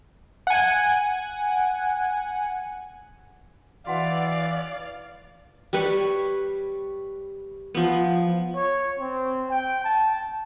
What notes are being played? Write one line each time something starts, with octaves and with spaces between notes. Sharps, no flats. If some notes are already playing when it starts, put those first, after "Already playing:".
F#5 G#5
E3 F#4 D5 F5 F#5 A5
G3 B4 C#5
F3 B3
C#5
C4
G5
A5